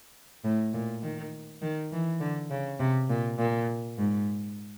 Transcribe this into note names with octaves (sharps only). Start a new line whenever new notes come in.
A2
A#2
D#3
D#3
E3
D3
C#3
C3
A#2
A#2
G#2